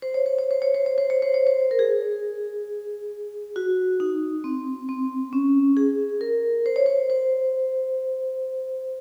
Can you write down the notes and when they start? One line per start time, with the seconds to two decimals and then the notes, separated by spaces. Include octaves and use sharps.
0.02 C5
0.14 C#5
0.26 C5
0.38 C#5
0.51 C5
0.62 C#5
0.75 C5
0.86 C#5
0.98 C5
1.10 C#5
1.22 C5
1.34 C#5
1.47 C5
1.71 A#4
1.79 G#4
3.56 F#4
4.00 D#4
4.44 C4
4.89 C4
5.33 C#4
5.77 G#4
6.21 A#4
6.66 C5
6.76 C#5
6.86 C5
7.10 C5